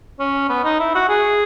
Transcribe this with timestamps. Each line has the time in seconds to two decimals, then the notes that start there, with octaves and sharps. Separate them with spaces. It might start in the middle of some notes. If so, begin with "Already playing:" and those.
0.20 C#4
0.49 B3
0.64 D#4
0.79 E4
0.95 F#4
1.09 G#4